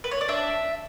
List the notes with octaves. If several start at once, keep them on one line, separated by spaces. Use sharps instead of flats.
B4
C#5
D5
D4 E5